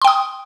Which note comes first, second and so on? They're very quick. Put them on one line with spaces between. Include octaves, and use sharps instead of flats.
C6 G5 D#6